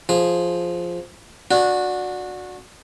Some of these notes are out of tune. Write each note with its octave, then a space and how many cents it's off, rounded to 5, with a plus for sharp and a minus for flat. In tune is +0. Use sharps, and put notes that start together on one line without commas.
F3 +0 G#4 +0
D4 +0 F#4 -20